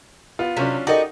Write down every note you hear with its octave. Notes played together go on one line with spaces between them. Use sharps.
B3 F4
C3 F#3 C#4 D4 B6
D#4 F#4 G4 A4 A#4 D5 D#5 F#5